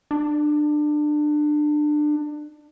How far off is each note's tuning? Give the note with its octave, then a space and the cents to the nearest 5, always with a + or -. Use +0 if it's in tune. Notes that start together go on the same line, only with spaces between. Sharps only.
D4 +25